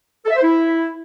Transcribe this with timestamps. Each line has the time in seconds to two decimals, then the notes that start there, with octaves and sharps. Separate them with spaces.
0.24 A4
0.30 E5
0.36 C5
0.42 E4